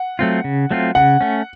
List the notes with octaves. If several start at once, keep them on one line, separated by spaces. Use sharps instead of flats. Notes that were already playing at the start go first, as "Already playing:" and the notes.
Already playing: F#5
F#3 A3 C4 F4
C#3
F#3 A3 C4 F4
C#3 F#5
A3 C#4